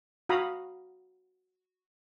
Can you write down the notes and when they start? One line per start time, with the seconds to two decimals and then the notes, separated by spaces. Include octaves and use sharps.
0.29 F#4 F5 A#5 B5 D#6